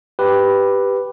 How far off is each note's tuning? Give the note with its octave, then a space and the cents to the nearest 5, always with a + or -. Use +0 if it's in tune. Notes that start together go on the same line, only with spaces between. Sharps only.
G4 +0 B4 +0